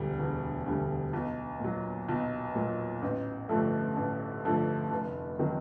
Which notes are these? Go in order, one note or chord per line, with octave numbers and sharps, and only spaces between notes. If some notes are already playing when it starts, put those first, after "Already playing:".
Already playing: E1 D2 D3 G3
E1
D2 D3 G3
B1
A#2 F#3
B1
A#2 F#3
A1
G2 D3 F3 A3
A1
G2 D3 F3 A3
F1
C3 D#3 F#3